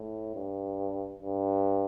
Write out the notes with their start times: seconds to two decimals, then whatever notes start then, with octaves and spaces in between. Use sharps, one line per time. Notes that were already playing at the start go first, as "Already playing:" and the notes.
Already playing: A2
0.35 G2
1.22 G2